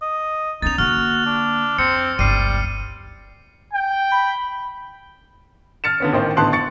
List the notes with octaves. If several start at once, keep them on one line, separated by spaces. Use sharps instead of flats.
D#5
B3 C#4 D#4 A6 F7
D3 A#3 F#4 F6
D4
F2 C4 C#7
G1 C#2 G3 C7 D#7
G5
B5
F6 A6 C#7 E7
D3 B3 C#4
A1 D#3 C5
A1 D3 B3 A5 C6 F#6
C#6 A6 C#7